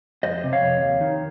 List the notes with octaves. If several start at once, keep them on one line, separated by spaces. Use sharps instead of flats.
F2 C5 D#5
C3
C#5 F5
F2
D#2
D#3